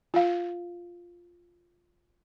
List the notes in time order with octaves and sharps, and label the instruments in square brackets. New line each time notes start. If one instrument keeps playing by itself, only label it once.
[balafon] F4 F5